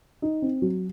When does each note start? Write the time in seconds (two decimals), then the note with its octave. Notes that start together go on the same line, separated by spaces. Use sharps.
0.22 D#4
0.42 C4
0.62 F#3